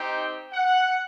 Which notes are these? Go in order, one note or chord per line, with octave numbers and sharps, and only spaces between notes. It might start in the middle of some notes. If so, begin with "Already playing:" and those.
Already playing: C4 D#4 G4 G5
F#5